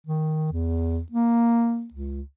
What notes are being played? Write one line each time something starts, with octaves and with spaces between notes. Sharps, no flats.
D#3
E2
A#3
C#2